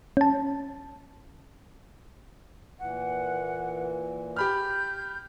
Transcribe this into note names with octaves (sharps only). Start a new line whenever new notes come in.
C#4 A5
A#2 E3 F#5
G4 B5 F6 G6